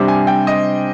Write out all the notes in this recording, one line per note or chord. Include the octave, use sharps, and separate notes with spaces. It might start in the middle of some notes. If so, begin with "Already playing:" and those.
Already playing: C3 G3 D4 C5
G#5
G5
D#5